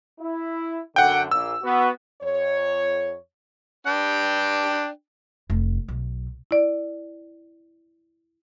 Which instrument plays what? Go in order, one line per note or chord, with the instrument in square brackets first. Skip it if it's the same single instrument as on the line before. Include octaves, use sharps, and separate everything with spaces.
[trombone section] E4
[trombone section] F#2 D3 [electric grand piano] F#5 G5
[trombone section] A#1 A#2 [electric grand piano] E6
[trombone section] B3 F#4
[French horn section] F2 C#5
[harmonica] D4 G5
[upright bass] F1
B1
[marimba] E4 D5